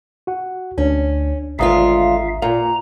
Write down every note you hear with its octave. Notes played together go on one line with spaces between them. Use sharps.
F#4 F#5
D2 C#4 D4
G#1 D2 G#3 F4 E5 F5 A#5 D#6
A#2 F5 A#5